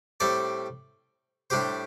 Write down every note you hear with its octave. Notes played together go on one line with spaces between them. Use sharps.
A2 G3 C4 A4 D5
A2 G3 D4 G4 C5